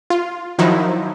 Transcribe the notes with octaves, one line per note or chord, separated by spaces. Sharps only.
F4
D#3 F3 F#3 D#4 E4